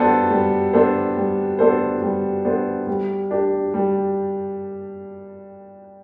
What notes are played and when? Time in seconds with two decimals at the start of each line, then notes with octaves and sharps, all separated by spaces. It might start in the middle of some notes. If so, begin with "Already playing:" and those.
Already playing: G3 B3 D4 A4 C5
0.31 G3
0.73 B3 D4 A4 C5
1.17 G3
1.59 B3 D4 A4 C5
2.02 G3
2.45 B3 D4 A4 C5
2.87 G3
3.31 D4 G4
3.74 G3